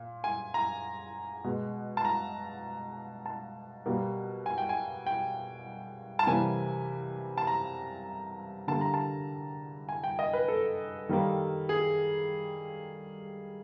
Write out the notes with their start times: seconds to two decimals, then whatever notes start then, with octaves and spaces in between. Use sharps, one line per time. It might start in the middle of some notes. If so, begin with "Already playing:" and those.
Already playing: A#2
0.24 G#5
0.54 A#5
1.44 B2 G#3
1.97 A5
2.05 A#5
3.26 A5
3.86 B2 G3 A#3
4.46 G#5
4.58 G5
4.69 G#5
5.06 G5
6.19 A5
6.27 C3 E3 G3 A#3 G#5
7.38 A5
7.47 A#5
8.68 D3 G3 A#3 A5
8.81 A#5
8.94 A5
9.89 G#5
10.04 G5
10.19 D#5
10.33 B4
10.48 A4
11.09 D#3 G3 A#3
11.69 G#4